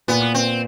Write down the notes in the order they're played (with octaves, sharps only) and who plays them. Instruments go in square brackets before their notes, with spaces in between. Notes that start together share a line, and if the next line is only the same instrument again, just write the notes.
[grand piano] A#2 [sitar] B3
[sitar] C4